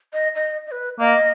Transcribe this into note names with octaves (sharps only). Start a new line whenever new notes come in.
D#5
D#5
D#5
B4
A#3 D#5